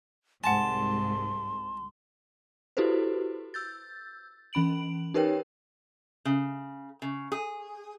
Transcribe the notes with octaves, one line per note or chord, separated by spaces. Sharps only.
C2 G#2 F#5 G#5 A5 C6
E4 F#4 G4 A4 B4 C5
E6 G6 A6
E3 C#4 B5 D7 F#7
D#4 G4 A#4 B4 C#5 G5
C#3
C#3
G#4